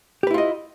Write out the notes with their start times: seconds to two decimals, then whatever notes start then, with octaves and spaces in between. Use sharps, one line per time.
0.23 G4
0.27 B4
0.31 E4
0.34 F4
0.38 D#5